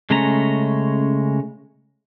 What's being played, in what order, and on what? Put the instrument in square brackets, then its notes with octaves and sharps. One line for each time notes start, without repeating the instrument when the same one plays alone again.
[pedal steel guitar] C#3 G#3 A3 C#4 A#5